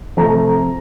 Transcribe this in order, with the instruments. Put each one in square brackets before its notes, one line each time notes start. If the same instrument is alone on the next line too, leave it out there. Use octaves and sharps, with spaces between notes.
[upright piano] C3 F3 A3 A#5